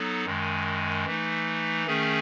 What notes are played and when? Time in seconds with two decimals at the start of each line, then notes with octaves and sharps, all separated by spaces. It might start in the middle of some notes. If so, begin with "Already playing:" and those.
Already playing: F#3 B3 D#4 A4
0.25 F#2 D#3 G#3
1.05 E3 A3 D#4
1.86 D#3 A3 C#4 G#4